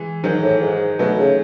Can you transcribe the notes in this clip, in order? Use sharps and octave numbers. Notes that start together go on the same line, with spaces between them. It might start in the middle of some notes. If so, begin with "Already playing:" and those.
Already playing: E3 G#3
G#2 D#3 F#3
A2
G#2
B2 F#3 A3
C#3